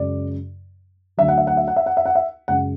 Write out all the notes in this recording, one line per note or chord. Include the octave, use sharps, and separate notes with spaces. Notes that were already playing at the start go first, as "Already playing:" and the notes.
Already playing: F#2 C#3 G#3 D5
D2 D3 F#3 E5
F#5
E5
F#5
E5
F#5
E5
F#5
E5
F#5
E5
F#2 C#3 G#3 F#5